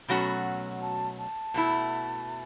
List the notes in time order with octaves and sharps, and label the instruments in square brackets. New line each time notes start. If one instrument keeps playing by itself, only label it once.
[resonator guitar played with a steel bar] B2 F#3 A3 C#4 F#4 [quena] B5
[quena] A5
A5
[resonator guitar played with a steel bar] B2 A3 E4